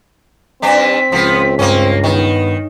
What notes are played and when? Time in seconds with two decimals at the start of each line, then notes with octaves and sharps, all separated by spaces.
0.62 G2 C4 D4 B6
1.12 C#2 F3 B3
1.59 G2 A#3 C4 C#4
2.04 D#3 B3